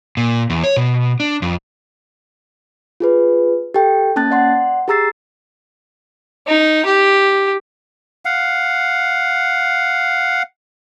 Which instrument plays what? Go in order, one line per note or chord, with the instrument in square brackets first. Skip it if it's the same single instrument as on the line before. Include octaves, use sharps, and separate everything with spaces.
[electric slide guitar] A#2
E2
C#5
B2
D4
F2
[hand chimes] F4 G#4 B4
G4 A4 G5
A#3 C#4 A5 F#6 A6
D5 F#5 C6
G4 G#4 A#5 E6 A6 C7
[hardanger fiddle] D#4
G4
[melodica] F5 F#5